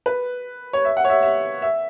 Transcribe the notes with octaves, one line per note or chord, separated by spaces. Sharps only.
B4
C#5
E5
F#5
C#5
E5
E5
E5